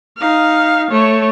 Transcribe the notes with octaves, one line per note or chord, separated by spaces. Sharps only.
D#4 F5
A3 C#5